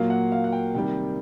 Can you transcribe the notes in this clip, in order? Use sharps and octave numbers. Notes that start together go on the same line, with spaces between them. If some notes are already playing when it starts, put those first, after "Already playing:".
Already playing: A#2 F#3 A#3 F5
F#5
F5
F#5
G5
C3 D#3 G3 G5